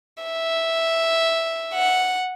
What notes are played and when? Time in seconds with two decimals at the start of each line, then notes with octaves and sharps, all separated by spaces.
0.23 E5
1.73 F#5